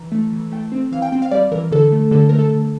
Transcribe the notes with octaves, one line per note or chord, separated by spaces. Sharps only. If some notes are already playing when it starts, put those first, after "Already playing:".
Already playing: E3 A#5
A3
E3
A3 G5
C4
E3 F5
G5
C4 G5
F5
G3 D5
E3 A#4
D3 A4
A3
D3 A4
A3 A#4
A4
D3